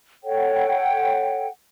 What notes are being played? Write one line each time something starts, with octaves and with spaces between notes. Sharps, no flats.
A4 C#5 F#5 G5